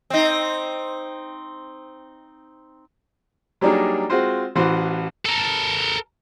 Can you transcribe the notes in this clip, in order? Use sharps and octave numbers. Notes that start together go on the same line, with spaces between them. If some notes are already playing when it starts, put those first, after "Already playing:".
C4 D#4
F#3 G3 A#3 D4 D#4 G#4
G#3 C4 F4 F#4 C5
A1 E3 F#4 C5
A4 A#4